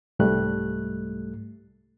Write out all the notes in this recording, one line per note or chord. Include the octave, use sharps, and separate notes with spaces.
C2 G#2 G3 A3 F#6